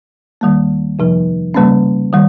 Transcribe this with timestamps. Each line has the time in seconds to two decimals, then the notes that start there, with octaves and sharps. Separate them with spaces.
0.41 D#2 D#3 G3 A#3
0.99 F2 C3 F3
1.54 C#3 G3 A#3 C#4
2.13 D#3 G3